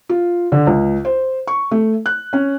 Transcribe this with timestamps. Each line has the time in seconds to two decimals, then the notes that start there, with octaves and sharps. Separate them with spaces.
0.09 F4
0.52 D3
0.67 C#2
1.05 C5
1.47 C#6
1.71 A3
2.06 F#6
2.33 C#4